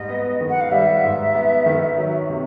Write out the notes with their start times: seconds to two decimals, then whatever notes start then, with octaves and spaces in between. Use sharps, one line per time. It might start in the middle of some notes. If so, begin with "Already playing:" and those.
Already playing: G#2 G3 D#5
0.09 B3
0.41 D#3
0.49 F#5
0.60 F5
0.71 G3 E5
1.04 G#2
1.34 B3
1.66 D#3
1.98 F#3
2.30 C3